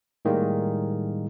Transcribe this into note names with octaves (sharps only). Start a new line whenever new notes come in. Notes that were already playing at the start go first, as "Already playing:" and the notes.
A2 D#3 G3 G#3 A#3